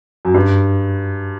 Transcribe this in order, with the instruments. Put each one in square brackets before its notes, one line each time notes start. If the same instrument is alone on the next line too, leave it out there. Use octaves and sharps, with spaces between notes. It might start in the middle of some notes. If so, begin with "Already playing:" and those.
[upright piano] F#2
G2